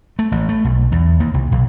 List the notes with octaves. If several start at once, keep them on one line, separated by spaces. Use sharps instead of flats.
A3
A1
A3
B1
E2
D#2
C2
B1